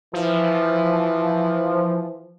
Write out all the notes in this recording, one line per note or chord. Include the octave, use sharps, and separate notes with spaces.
E3 F3